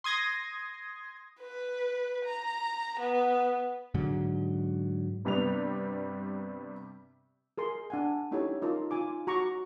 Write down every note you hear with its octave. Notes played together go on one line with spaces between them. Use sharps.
C6 D#6 G#6 A#6
B4
A#5
B3
G#2 D3 F#3
G2 C3 G3 B3 F7
G#4 A#4 C6
D4 F#5 G#5
C#4 D#4 E4 G4 A4 C#5
D#4 F4 A#4 A5
D#4 F4 G#5 D6
F#4 A#5 C#6 D6